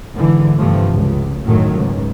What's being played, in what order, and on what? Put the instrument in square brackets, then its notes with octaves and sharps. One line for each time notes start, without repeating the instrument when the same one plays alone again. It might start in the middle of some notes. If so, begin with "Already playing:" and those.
[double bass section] G#2 D3 E3
G2 C3 E3 F3 A3
C#2
F#2 A2 D#3 F#3 A3
C#2 G#2